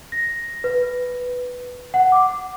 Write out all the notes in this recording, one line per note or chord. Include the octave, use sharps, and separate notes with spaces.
A#6
B4
F#5
D6